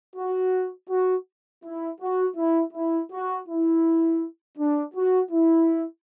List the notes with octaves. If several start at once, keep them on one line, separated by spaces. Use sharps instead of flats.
F#4
F#4
E4
F#4
E4
E4
F#4
E4
D4
F#4
E4